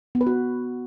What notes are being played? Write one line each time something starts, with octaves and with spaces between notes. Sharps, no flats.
B3
B4
F#4